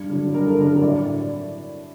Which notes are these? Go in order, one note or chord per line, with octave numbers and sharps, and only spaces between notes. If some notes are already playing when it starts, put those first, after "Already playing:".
Already playing: G2
D3 F#3
G2 A#4
A4
D3 F#3 A#4
A2 D5